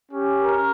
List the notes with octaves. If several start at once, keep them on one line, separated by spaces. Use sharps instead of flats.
C#4 G4
A#4